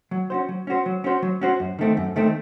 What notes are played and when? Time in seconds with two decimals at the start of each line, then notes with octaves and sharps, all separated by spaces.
0.11 F#3
0.30 C#4 F#4 C5
0.49 F#3
0.67 C#4 F#4 C5
0.86 F#3
1.04 C#4 F#4 C5
1.22 F#3
1.41 C#4 F#4 C5
1.60 F#2
1.79 D#3 A3 C4
1.97 F#2
2.16 D#3 A3 C4